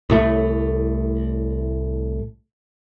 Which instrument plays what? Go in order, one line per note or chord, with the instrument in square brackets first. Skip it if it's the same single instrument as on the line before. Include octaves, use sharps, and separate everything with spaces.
[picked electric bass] C2 A2 A3